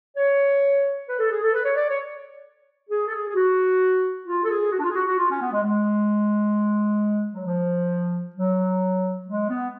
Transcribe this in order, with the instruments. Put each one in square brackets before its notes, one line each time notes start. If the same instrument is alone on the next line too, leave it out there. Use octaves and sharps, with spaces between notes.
[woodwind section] C#5
B4
A4
G#4
A4
B4
C#5
D5
C#5
G#4
A4
G#4
G#4
F#4
F4
A4
G#4
F#4
D4
F4
G#4
F#4
F#4
F4
C#4
B3
G#3
G#3
F#3
F3
F#3
G#3
B3